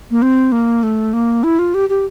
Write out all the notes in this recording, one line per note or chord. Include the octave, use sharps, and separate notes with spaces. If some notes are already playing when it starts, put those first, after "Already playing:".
A#3
C4
A#3
A3
A#3
E4
F4
G4
G4